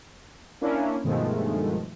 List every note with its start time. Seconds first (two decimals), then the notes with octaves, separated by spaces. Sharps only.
0.61 A#3 C#4 D4 E4
1.04 G2 B2 D#3 F3 G#3 A3